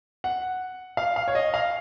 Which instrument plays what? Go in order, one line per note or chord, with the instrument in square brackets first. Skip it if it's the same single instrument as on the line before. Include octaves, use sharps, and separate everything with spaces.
[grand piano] F#5
F5
F5
C#5
D#5
F5